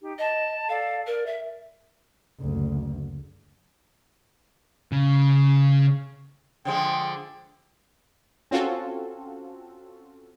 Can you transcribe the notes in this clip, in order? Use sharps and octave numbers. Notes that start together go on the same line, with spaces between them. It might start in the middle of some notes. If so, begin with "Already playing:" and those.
D#4 G4
D#5 A5
A4 D5 F5
A#4 D5
E5
F#1 D2
C#3
D3 F3 G#3 G5
C4 C#4 F4 F#4 A4